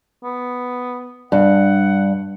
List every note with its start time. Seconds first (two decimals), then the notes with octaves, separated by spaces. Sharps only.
0.23 B3
1.32 G2 F#5